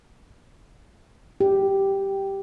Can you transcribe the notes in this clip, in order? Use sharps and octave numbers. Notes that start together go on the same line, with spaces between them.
G4